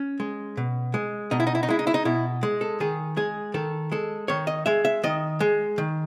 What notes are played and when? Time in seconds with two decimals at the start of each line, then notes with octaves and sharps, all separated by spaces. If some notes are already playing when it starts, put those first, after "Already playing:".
Already playing: C#4
0.20 G#3
0.57 B2
0.94 G#3
1.31 B2 D#4
1.40 E4
1.47 D#4
1.55 E4
1.63 D#4
1.69 G#3 E4
1.79 D#4
1.87 E4
1.94 D#4
2.05 B2 E4
2.43 G#3
2.61 A4
2.80 D#3 G#4
3.17 G#3 G#4
3.54 D#3 A4
3.92 G#3 A4
4.28 D#3 C#5
4.47 D#5
4.66 G#3 E5
4.85 E5
5.04 D#3 D#5
5.40 G#3
5.78 D#3